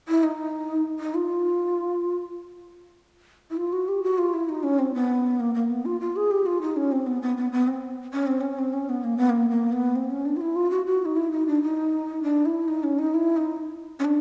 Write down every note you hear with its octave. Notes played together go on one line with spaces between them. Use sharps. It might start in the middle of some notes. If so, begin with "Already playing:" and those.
E4
D#4
D#4
F4
E4
F4
F#4
G4
F#4
F4
E4
D#4
C#4
C4
B3
A#3
A#3
B3
F4
F4
G#4
G4
F4
D#4
C#4
C4
B3
B3
B3
B3
C4
C#4
C4
C#4
C4
C#4
B3
A#3
B3
A#3
A#3
B3
C4
C#4
D4
F4
E4
F4
F#4
F#4
D#4
E4
D#4
D4
D#4
D4
E4
D#4
C#4
D#4
E4
D#4
C#4
D4